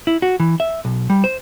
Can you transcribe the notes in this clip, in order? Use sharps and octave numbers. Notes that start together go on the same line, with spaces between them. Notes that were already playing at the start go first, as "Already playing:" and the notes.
E4
F#4
E3
E5
B1
G3
C5